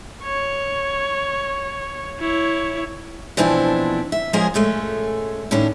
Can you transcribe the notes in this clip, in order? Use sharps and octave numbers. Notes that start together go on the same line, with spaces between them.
C#5
E4 C#5
B2 E3 F3 C4 D4 E4
E5
F3 G#3 C#4 G#4 A#4 D#5
A#2 G#3 A3 C#4
A2 D#3 C#4 D4